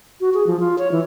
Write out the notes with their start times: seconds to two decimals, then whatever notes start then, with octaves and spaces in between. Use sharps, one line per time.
0.21 F#4
0.34 G#4
0.47 F3
0.60 F4
0.78 C#5
0.92 E3